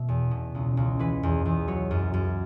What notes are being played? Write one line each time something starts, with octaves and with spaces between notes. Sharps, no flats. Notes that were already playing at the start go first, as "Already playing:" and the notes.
Already playing: B2 E5
E2
B2
C#2
C#2
E3 B4
E2
E2
F#3 C#5
F#2
F#2